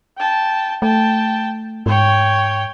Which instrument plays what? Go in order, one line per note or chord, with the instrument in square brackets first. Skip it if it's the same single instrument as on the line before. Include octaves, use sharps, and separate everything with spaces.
[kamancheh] G5 A5
[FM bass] A3 [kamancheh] G5 A5
[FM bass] G#2 [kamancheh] C#5 G5